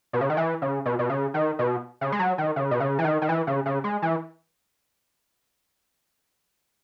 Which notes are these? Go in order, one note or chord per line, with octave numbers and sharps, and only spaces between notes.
B2
C#3
D#3
E3
C#3
B2
B2
C#3
D#3
B2
C#3
G#3
F#3
D#3
C#3
B2
C#3
E3
D#3
D#3
E3
C#3
C#3
G#3
E3